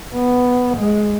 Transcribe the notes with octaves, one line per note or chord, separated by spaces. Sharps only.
B3
G#3